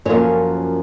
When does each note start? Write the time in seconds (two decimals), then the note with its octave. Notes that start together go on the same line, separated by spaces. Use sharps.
0.05 F#2 F3 A#3 C#4 C#5